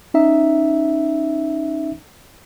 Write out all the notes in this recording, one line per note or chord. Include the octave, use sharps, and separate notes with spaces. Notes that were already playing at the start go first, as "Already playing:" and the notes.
C#4 D#4 E5